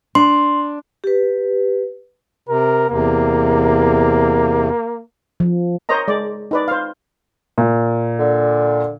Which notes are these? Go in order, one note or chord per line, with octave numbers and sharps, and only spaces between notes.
D4 C6
G4 B4
C3 A#4
E2 C3 A#3
F3
A#4 C5 C#5 D#5 A#5
G#3 D5
D#4 B4 D5
C5 F5
A#2
D3